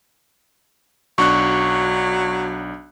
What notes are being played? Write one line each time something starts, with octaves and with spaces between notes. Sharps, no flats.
B1 F#3 D4 C#6 F#6